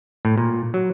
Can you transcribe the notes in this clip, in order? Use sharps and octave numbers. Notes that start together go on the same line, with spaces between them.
A2
A#2
F#3